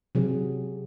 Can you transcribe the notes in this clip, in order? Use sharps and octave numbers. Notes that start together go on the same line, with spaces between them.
C3 F#3 G#4